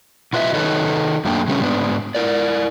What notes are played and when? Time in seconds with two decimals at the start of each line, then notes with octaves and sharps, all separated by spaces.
0.33 B2 F4 B4 D#5 E5
0.54 D#3 D#4 A4 B4 C#5 D#5
1.25 F#2 A3 A#3 D4 G5
1.48 C#3 G3 A3 A#3 C#4
1.61 G#2 B3 D4
2.15 E4 A#4 D5